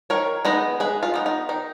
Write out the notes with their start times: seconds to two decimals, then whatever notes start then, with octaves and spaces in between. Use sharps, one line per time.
0.10 D#3 A#4 C#5
0.45 G#3 B3 D#4 B4 D#5
0.80 G#3 G#4 B4
1.03 F4
1.14 B3 D#4
1.26 D#4
1.49 D#3 D#4